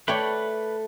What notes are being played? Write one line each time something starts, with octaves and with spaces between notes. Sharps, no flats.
A3 B4 C#5 D5 G5 B5